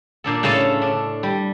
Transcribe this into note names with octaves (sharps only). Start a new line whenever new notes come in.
A#2 D4 A4
A2 C#3 C#4 A4 A5
D4
G3